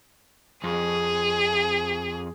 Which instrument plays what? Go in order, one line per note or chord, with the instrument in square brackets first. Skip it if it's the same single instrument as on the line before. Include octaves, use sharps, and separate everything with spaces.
[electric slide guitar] F2 [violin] G#4